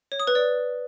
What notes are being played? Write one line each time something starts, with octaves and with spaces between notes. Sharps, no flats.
C#5
D#6
B4
D5